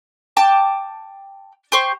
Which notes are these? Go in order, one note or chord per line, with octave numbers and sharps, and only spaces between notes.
G5 A5 D6
G4 C5 C#6